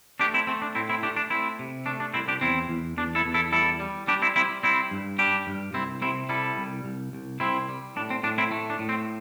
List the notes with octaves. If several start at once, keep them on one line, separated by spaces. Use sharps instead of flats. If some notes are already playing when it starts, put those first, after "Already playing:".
A3 D4 G4
C4 E4
A3 C4
D4
A2 C4 E4
C4 E4
A3 D4 G4
D4
A3 C4 E4
C3
A3 D4
D4
C2 C4 E4
D4 G4
E2 C4 E4
E2
E2 D4
E4 A4
E2
E4 A4
G3 E4 A4
G3
G3 D4 G4
C4 E4
G3 C4 E4
G3 C4 E4
G2
G3 D4 G4
G2
C2 C4 E4
C3 C4 E4
G3 E4 A4
C2
C2
C2
C2 C4 E4
G3
A2 D4
C4
A2 D4
C4 E4
A3
D4
A2
C4